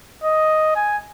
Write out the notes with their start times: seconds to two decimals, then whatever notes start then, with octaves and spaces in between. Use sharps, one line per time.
0.24 D#5
0.76 G#5